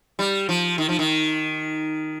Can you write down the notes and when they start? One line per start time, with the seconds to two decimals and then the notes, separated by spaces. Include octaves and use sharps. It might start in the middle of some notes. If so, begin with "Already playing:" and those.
0.19 G3
0.49 F3
0.78 D#3
0.89 F3
0.99 D#3